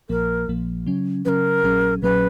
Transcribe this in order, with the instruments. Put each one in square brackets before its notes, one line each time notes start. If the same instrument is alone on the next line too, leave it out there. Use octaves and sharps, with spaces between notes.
[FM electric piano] A#1 A#2 F3 A#3 [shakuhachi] A#4
[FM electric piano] A#1 A#2 F3 A#3
C#3 F#3 C#4
[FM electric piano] C#3 F#3 C#4 [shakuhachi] A#4 B4
[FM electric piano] A#1 A#2 F#3 C#4 G#4
[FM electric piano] A#1 A#2 F#3 C#4 G#4 [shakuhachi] B4